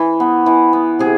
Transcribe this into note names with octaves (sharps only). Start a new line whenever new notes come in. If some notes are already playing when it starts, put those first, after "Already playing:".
Already playing: E3
B3
E3
B3
C3 G#4